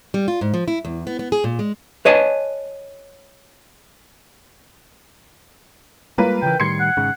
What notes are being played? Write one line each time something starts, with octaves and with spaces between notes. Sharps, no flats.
G3
F4
G#2
F3
E4
E2
B3
B3
G#4
A#2
G#3
B4 C#5 D#5 G#5 A5
G3 G#3 A#3 F4 A#4 B4
C#3 E3 G5
A2 D#3 G3 C6 G#6 C7 C#7
F#5
G#1 G#2 C#3